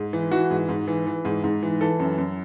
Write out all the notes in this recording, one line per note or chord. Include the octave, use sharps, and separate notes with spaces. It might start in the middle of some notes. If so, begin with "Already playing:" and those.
Already playing: G#2
E3
E3 F#4
G#2
G#2
E3
E3
G#2
G#2
E3
E3 A4
F#2
F#2